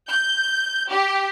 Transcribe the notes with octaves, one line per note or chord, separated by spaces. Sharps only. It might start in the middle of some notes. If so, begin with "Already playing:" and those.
G6
G4